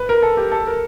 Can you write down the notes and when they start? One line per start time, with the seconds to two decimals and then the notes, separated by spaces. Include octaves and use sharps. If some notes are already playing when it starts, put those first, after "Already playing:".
Already playing: B4
0.09 A#4
0.22 A4
0.37 G4
0.52 A4
0.67 A#4